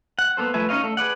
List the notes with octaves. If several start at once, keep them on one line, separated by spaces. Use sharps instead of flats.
F#5
A#3 B3 A4 C5
F3 A3 B4 E5 G#5
C#4 D#4 C#5 D#5 F5
A3 A4
G#4 B4 D5 F#5